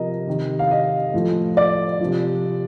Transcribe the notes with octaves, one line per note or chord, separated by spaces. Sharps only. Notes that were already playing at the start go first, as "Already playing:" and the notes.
Already playing: C3 F3 A#4 D#5
C3 D#3
F5
D#5
A2 F3
D5
C3 F3